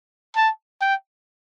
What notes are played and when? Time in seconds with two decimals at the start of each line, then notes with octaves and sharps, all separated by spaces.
0.36 A5
0.81 G5